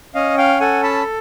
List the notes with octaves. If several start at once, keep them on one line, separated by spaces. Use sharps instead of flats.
C#4 D#5 F5
F5 G5
A4 F#5 G#5
A5 B5